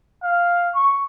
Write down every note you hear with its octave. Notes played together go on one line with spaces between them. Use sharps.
F5
C#6